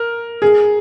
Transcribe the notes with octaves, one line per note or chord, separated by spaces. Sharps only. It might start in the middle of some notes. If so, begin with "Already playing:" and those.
Already playing: A#4
G#4